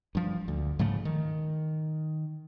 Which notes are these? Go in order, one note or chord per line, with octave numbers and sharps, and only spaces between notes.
G2 F3
D2
G#2 C#3 F3 A3
D#3